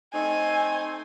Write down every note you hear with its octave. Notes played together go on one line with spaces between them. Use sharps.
A3 C4 D#4 G#5